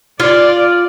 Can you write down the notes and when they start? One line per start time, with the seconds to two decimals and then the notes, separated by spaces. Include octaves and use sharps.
0.20 F4 D5